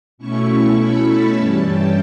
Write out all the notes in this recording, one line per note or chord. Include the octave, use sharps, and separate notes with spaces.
B2 A3 C#4 E4 C#6
B5
A5
G2 E3 G3 C#4
G5